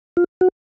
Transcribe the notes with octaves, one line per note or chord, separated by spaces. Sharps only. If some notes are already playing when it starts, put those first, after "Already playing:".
F4
F#4